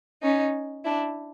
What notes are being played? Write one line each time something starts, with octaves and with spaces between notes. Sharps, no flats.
C#4 D#4
D4 E4